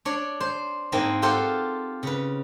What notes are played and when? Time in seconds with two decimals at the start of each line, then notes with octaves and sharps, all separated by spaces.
0.05 D4 C#5 D5
0.40 C5
0.92 G#2 A#3 C4 E4 D#5 A5
1.22 F4 G4 A4 C5 F5 F#5
2.03 C#3 B4